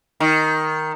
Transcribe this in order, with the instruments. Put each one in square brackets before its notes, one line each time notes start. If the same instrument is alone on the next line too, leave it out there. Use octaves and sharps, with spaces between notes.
[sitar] D#3